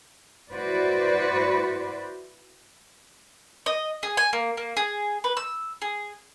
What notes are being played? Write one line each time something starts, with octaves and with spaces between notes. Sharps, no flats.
E4 F#4 B4 C5 D5
D#5
G#4
G#5
A#3
A#3
G#4
B4
E6
G#4